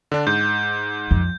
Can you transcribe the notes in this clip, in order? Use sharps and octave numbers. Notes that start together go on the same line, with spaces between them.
D3 D4
G#2 G6
F2